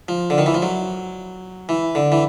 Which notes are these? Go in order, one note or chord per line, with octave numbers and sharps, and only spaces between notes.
F3
D3
D#3
E3
F3
F#3
E3
D3
E3